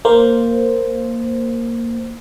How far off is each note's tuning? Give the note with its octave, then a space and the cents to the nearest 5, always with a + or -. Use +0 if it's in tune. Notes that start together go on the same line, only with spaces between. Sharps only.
A#3 -5 C5 +0